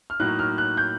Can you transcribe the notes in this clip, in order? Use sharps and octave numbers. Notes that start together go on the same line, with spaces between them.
F6
A2 F#3 A#3 D#4 F#6
F6
F#6
G6